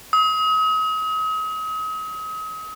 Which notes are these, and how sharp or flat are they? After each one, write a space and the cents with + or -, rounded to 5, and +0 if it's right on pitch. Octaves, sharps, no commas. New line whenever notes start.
D#6 +40